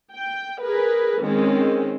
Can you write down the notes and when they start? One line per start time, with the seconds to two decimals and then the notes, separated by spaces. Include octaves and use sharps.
0.12 G5
0.60 G#4 A#4 B4
1.21 D#3 G#3 C4 C#4